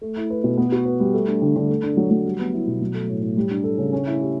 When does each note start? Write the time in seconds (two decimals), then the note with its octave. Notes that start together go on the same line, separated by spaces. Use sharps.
0.02 A3
0.17 E4
0.30 B4
0.44 B2
0.58 B3
0.72 F#4
0.85 B4
1.00 G3
1.14 A3
1.27 D4
1.42 D3
1.56 D3
1.69 A3
1.83 D4
1.97 F#3
2.11 F#3
2.25 G3
2.39 B3
2.53 E4
2.67 B2
2.81 F#3
2.94 A3
3.09 A2
3.22 A2
3.37 G3
3.50 D4
3.64 A4
3.78 C#3
3.93 C#4
4.07 E4
4.21 G4